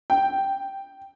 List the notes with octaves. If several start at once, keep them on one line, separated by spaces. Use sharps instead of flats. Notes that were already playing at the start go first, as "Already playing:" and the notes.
G5